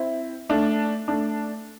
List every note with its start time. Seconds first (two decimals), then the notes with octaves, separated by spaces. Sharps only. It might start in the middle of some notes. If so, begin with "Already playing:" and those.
Already playing: C4 E4
0.49 A3 D4
1.08 A3 D4